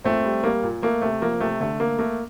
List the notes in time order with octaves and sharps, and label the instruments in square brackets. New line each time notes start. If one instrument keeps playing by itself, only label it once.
[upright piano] A#2 A3 C4
G3
G3 A#3
A#2
A3 A#3
C3 A3
F3 A#3
C3 A3
D3 A3
A3 A#3
A3 A#3